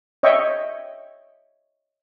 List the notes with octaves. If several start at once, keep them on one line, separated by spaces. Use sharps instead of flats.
C#5 D#5 E5 G5 C#6